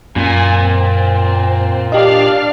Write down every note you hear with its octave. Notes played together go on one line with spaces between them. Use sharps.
F#2 A#2 G#5
C4
D4 G4 D5 D#5 F5